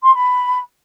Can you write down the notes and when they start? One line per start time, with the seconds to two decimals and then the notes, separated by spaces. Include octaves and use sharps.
0.03 C6
0.14 B5